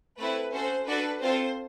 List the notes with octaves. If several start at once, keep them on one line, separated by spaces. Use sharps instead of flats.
A3 C4 E4 B4
C#4 F#4 A4 C5
D4 F#4 A4 B4
C4 F4 A4 C5